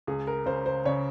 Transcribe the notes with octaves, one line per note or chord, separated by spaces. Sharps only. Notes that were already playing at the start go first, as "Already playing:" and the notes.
C#2 G#4
A#4
C#3 C5
C5
C#3 C#5